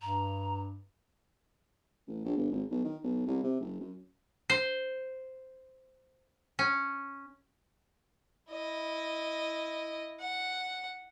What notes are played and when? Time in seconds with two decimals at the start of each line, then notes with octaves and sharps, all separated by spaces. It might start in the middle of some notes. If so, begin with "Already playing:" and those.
0.02 G2 A#5
2.08 A1
2.25 A#1
2.37 G1
2.51 G#1
2.71 B1
2.84 D#3
3.03 B1
3.27 C2
3.44 C3
3.60 F#1
3.80 F#2
4.50 C5
6.59 C#4
8.52 E4 D#5
10.20 F#5